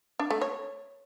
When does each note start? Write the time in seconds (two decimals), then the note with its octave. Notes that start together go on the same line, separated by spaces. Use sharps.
0.19 D4
0.31 A3
0.42 C#5